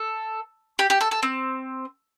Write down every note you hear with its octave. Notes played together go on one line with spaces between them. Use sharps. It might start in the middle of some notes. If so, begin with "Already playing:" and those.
Already playing: A4
G4
G4
A4
A4
C4